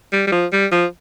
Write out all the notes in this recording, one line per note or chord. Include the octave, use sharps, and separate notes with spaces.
G3
G3
F3
G3
F3